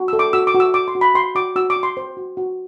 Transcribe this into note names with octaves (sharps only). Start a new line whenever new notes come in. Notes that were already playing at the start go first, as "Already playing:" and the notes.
Already playing: F#4
A4 E6
D6
F#4 E6
D6
F#4
E6
F#4 D6
C6
F#4
B5
F#4 C6
F#4 D6
F#4 E6
D6
F#4
C6
C5
F#4
F#4